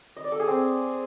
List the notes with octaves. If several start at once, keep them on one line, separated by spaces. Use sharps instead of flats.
D#5
D5
A4
G#4
C4